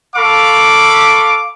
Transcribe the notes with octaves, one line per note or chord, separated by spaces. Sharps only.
A4 F5 B5 C#6 D6